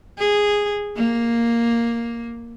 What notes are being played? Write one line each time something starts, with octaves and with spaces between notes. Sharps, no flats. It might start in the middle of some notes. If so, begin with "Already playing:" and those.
G#4
A#3